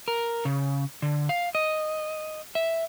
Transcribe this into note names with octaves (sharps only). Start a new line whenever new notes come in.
A#4
C#3
D3
F5
D#5
E5